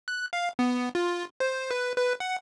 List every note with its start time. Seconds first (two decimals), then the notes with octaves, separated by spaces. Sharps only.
0.08 F#6
0.33 F5
0.59 B3
0.95 F4
1.40 C5
1.71 B4
1.97 B4
2.20 F#5